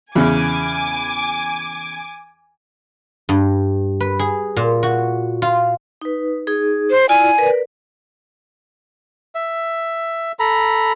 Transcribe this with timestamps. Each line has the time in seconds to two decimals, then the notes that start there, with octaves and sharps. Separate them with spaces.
0.15 E2 C#3 G#5 D6
3.29 G2
4.01 B4
4.19 G#4
4.57 A#2
4.83 F#4
5.42 F4
6.01 D#4 B4
6.47 D#4 G#4
6.90 C5
7.09 E4 F4 D5 G#5
7.38 A#4 B4 D5
9.35 E5
10.39 A4 A#5 B5